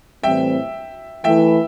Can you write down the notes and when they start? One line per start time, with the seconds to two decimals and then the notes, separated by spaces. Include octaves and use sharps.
0.23 A2 E3 G3 C4 E5 G5
1.24 E3 A3 E4 E5 G5